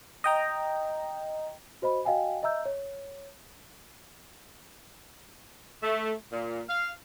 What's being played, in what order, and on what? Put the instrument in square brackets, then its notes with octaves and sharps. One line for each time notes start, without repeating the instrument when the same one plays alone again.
[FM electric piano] D#5 G5 A#5
[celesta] F#4 C5 D#5 B5
F#4 D#5 F5 G5 G#5
D#5 E5 A#5 E6 G6
C#5
[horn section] A3
A#2
F5